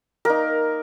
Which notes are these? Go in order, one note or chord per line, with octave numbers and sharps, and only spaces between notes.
A#3 D#4 A#4